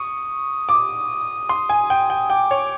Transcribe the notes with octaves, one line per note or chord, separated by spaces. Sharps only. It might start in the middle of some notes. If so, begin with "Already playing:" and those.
Already playing: C#6 D#6
D6
C6
G#5
G5
G5
G5 D6
C#5